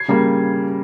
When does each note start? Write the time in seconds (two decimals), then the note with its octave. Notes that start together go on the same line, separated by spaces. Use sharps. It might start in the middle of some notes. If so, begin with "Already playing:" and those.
Already playing: G#6 C7
0.08 C#3 G3 A#3